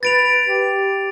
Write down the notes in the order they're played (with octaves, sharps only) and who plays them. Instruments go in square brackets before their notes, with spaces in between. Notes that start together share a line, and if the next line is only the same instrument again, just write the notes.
[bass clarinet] B4 [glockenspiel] A6 D7 F7
[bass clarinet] G4